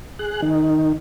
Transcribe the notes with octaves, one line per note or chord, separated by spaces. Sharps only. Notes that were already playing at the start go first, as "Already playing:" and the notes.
G#4 F#6
D#3 D#4